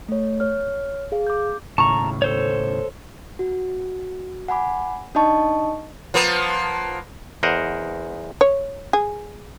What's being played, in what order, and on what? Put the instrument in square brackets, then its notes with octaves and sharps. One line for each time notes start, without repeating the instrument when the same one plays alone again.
[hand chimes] A3 C#5
C#5 F6
G#4 F5
D6 G6
[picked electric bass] D#2 A2 C#3 [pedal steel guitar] A5 A#5 [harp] C#6
[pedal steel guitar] A4 C5 C#5
[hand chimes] F#4
F#5 G#5 B5 D6
D4 D#4 D#5 A5 C#6
[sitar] F3 A#3 B3
[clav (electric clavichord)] E2 A#4 C5 D#5 F#5
[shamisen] C#5
G#4